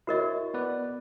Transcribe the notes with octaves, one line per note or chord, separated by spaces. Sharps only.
E4 F#4 A#4 C#5 D#5
B3 B4 D5